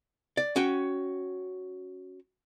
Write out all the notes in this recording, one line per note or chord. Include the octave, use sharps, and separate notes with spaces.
D5
C#4 F#4 G5